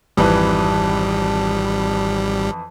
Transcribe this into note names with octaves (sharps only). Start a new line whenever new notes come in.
G#1 F2 E3 G3 B4